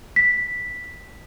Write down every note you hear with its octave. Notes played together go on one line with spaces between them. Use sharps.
B6